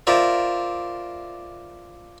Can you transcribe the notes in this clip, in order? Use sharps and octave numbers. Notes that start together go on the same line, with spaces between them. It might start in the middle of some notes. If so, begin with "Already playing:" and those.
F4 A#4 C5 D5 E5